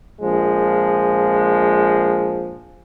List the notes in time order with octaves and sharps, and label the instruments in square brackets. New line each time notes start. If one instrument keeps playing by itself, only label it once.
[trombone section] A#1 F3 G#3